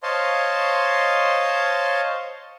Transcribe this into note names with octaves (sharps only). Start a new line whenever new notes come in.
C5 C#5 D#5 F5 A5 C6